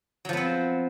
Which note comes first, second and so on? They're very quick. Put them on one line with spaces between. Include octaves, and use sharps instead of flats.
F#3 F3 B3 C4